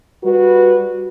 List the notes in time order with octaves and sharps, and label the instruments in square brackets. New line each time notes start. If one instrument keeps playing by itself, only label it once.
[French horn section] G3 F#4 B4